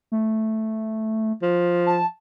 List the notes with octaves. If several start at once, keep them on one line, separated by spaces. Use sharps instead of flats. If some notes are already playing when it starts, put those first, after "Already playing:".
A3
F3
A5